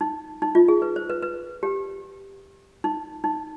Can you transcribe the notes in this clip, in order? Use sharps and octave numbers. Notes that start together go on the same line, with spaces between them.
D#4
D#4
F4
G#4
B4
C5
B4
B4
G4
D#4
D#4